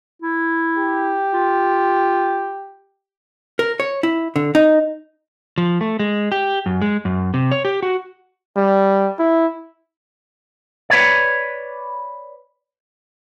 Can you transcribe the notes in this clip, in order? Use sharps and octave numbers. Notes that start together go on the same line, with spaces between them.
E4
G4
F4
A#4
C#5
E4
D3
D#4
F3
A3
G#3
G4
F#2
G#3
F#2
C3
C#5
G4
F#4
G3
E4
B4 C#5 D5